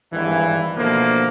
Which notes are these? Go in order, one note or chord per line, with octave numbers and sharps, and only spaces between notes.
G#1 G2 E3
B2 D3 F3 A3 A#3